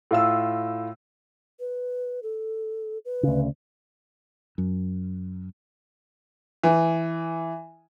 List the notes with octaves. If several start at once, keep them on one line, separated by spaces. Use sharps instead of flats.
A2 F4 E6
B4
A4
B4
D2 C#3
F#2
E3